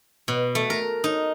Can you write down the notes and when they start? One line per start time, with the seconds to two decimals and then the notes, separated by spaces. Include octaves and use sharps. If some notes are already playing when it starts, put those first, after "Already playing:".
0.28 B2
0.55 A3
0.70 A#4
1.04 D#4